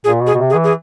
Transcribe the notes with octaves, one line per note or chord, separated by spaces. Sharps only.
A#2 G#4
B2
G#4
B2
C3
G#4
E3
G#4